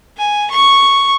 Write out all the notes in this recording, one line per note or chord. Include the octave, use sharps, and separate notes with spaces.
G#5
C#6